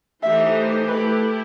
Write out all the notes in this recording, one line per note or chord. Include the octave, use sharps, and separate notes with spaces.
E3 A3 D#4 G4 C5 E5
A3 E4 G4 B4